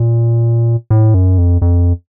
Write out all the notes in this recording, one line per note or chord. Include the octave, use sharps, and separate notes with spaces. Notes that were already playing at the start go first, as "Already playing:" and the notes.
Already playing: A#2
A2
F#2
F2
F2